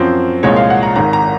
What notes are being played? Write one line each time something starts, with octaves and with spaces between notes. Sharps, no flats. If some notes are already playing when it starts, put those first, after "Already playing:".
Already playing: F#2 F3 C4
C2 A#2 F3 G#3 C#5
F5
F#5
A#5
G#1 G#2 D#3 A#5
A#5